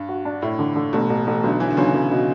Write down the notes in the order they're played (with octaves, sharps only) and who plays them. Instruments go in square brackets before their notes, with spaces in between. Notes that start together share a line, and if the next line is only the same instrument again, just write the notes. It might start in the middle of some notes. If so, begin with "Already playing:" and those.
Already playing: [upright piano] G2
[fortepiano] F#4
D4
[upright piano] A2 [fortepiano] E4
[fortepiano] D3
D3
[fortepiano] A1 [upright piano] B2
[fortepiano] A1
A1
[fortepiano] B1 [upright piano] D3
[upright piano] E3 [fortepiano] F#3
[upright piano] D3
[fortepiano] B1 [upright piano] C#3
[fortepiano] B1
B2